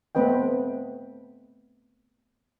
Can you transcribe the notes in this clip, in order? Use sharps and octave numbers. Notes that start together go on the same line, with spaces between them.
A3 B3 C4 B4 D#5 G5